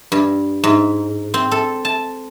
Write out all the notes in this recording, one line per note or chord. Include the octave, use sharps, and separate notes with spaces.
G2
G#2
C4
A4
A5